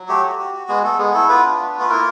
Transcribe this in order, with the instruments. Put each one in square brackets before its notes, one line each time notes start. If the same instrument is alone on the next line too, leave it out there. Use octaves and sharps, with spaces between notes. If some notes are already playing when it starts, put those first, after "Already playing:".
Already playing: [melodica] F#3
A3 G4
F#4
F#4
F#4
G#3 B3 G#4
A3 B3 A4
G#3 B3 G#4
A3 E4 A4
B3 F4 B4
D4
A3
F4
B4
A#3 E4 A#4